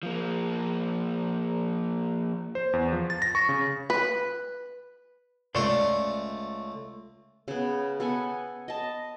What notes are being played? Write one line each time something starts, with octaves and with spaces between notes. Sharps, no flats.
F3 A#3
C5
E2
F3
A6
A#6
C#6
C#3
B4
C#2 A3 D5 C6
C#3 B3
B3 A4 F#5 G#5
D#5 A5